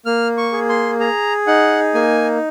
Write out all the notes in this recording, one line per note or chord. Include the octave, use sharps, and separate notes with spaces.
A#3 F6
C#6
G#4
C6
G#4 A#5
D#4 F#5
A#3 G#5